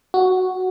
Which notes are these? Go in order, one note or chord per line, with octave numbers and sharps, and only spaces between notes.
F#4